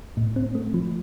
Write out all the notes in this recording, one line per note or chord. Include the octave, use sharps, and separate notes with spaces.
A2
C4
A3
F3